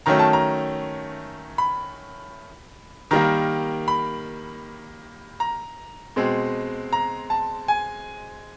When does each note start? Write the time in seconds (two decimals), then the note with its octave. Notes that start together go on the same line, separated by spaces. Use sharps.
0.06 D#3 F#3 A3 C#4 A#5
0.19 A5
0.33 A#5
1.58 B5
3.11 D#3 G3 A#3 A#5
3.88 B5
5.40 A#5
6.16 B2 G#3 C4
6.93 A#5
7.30 A5
7.68 G#5